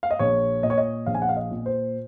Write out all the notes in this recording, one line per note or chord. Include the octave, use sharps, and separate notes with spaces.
F5
D#5
A#1 C#5
A#2 D#5
C#5
D#5
A#1 F5
G#5
F#5
F5
D#5
A#2
C5